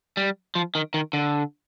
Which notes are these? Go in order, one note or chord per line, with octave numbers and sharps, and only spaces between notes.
G3
F3
D#3
D#3
D3